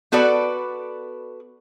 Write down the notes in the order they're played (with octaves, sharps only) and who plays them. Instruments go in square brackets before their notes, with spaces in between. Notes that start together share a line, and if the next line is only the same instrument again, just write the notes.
[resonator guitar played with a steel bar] B3 F#4 A4 B4 D5